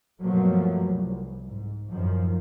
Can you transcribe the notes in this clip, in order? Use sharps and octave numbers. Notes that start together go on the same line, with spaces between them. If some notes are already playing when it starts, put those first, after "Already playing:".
G2 B2 F3 F#3 A3 A#3
C2
G#2
F#2 A2 D#3 F3